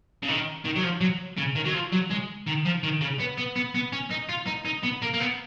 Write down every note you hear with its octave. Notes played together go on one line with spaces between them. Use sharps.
C#3
D#3
D#3
F#3
F3
F#3
C#3
D#3
F#3
F3
F#3
G#3
D#3
F3
D#3
C#3
B3
B3
B3
B3
C#4
D#4
F4
D#4
D#4
B3
A#3
A#3
B3